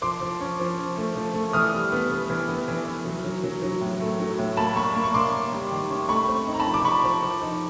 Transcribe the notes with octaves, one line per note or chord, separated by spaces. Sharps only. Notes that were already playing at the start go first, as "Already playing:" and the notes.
F3 C6 D6
F3
C#4
F3
C#4
A3
F3
A3
E3 D#6 F6
G3
B3
B3
E3
B3
E3
E3
F#3
F#3
F#3
F#3
A2
A3
F#3
A2
A#3 A5 B5
A#3 B5 C#6
A#3
C#6
A#3 C6 D6
A#3
G3
D#3
C#4
A3 B5 C#6
C4
D#4
A#5
A5 B5
F3
D6
F3 B5 C#6
F3
F3
D#4